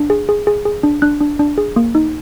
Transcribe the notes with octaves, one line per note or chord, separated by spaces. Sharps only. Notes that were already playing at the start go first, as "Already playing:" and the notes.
Already playing: D4
G#4
G#4
G#4
G#4
D4
D4 F#6
D4
D4
G#4
A#3
D#4